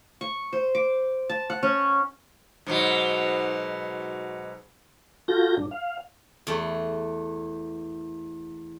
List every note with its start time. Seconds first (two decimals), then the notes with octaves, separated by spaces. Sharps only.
0.21 C#6
0.53 C5
0.75 D6
1.30 A5
1.50 F#5
1.63 C#4
2.66 G#2 B2 F#3
5.28 F4 F#4 A4 G6 A#6
5.57 G2 D4
5.71 F5
6.47 E2 A3